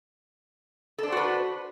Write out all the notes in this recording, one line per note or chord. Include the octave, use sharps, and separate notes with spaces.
D4 F#4 A4 B4 C5